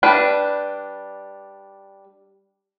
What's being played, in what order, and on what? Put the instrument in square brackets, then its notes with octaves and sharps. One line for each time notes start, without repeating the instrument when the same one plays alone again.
[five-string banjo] G3 D4 B4